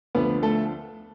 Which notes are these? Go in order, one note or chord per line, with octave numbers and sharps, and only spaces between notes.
D2 D3 F3 B3 B4
A3 A4